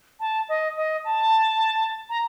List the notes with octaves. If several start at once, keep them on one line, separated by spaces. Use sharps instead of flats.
A5
D#5
D#5
A5
A#5